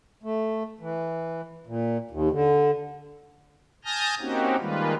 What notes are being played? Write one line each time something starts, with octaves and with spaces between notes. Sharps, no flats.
A3
E3
A#2
D#2
D3
G#5 A5 D#6 F6 G6 A#6
A#3 C4 C#4 D#4 F#4 G4
D#3 G3 G#3 A#3 F4 B4